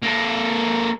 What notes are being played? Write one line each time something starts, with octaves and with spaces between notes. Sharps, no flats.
A#3 A4